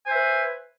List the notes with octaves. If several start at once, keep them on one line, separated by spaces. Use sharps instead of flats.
B4 C5 E5 G#5